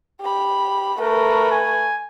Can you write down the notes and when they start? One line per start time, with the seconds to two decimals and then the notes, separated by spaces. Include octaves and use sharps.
0.20 G4 B5
0.99 A3 A#4 B4
1.51 G#5